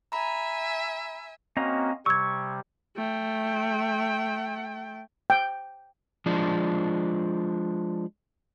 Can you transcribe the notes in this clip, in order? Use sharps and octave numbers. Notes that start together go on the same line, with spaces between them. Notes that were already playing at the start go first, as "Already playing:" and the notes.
E5 G#5 A#5 B5
A#3 C4 C#4 F#4 D#5 A#5
C3 G3 C#6 E6 G#6
A3 G5
G5
F3 G#3 D4